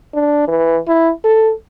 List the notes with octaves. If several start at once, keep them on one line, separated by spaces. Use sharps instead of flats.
D4
E3
E4
A4